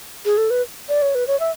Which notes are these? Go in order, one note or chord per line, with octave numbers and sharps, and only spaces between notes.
G#4
A4
B4
D5
C#5
B4
C#5
E5